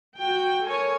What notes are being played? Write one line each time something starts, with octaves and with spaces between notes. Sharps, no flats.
F#4 G5
A4 A#4 C#5 G#5